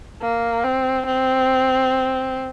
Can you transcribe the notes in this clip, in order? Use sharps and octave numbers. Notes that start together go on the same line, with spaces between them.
A#3
C4
C4